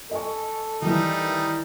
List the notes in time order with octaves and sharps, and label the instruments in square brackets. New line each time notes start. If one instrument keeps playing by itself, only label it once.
[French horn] A4 [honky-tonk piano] D#5 G#5 C#6
[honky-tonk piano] D#3 E3 [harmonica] G3 A3 D#4